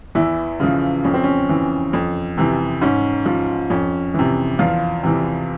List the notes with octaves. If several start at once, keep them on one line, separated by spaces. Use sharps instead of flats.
E2 E3 E4
C#3 F3
F2 C#4
C4
C#4
E3
F2
C3 E3
G#2 C#4
F3
F2 C#4
C3 E3
E2 F3 F4
C3 E3